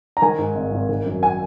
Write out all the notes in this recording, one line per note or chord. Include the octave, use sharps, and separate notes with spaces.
A#5
D#3 G#5
G#2
G#1
G#1
D#3
F#2
G#5